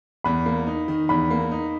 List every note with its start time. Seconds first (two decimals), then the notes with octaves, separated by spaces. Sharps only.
0.24 E2 B5
0.46 A#3
0.67 D#4
0.88 D#3
1.09 E2 B5
1.31 A#3
1.52 D#4